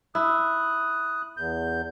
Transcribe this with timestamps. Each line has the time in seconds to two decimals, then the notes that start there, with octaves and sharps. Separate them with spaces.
0.15 E4 D#6 F#6
1.37 E2 G6